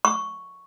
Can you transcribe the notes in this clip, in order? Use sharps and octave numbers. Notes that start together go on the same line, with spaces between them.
C#6